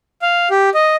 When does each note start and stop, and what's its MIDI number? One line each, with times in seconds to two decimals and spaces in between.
0.22 0.49 77
0.51 0.70 67
0.74 0.96 75